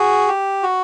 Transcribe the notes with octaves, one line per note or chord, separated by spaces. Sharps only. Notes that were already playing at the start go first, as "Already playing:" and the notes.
Already playing: F#4 G#4
G4
F#4